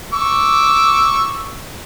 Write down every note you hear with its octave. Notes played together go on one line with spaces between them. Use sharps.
C#6 D6 E6